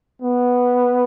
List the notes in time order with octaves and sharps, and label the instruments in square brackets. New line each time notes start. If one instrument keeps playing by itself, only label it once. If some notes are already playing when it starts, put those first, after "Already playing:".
[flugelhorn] B3